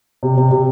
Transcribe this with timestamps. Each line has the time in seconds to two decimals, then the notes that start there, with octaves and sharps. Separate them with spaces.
0.23 C3
0.37 C3
0.51 C3